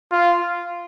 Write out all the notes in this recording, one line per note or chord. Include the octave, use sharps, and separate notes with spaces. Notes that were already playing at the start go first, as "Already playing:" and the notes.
F4